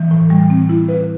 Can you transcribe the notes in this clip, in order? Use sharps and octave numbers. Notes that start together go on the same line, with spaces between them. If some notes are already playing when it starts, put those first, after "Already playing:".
Already playing: E3
A2
G3
C4
E4
B4